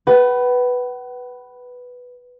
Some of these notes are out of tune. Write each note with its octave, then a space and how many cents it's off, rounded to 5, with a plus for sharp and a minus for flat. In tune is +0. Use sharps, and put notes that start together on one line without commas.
B4 +0 F#5 +40